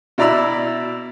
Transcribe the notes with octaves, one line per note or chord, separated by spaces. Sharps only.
B2 E4 D5 A#5 B5 E6